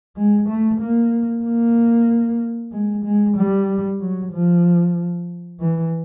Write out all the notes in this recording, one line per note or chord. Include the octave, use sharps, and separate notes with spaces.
G#3
A3
A#3
A#3
G#3
G#3
G3
F#3
F3
E3